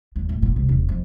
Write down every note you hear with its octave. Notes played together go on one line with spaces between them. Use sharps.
D#2
A2
A#2
C2
E1
F2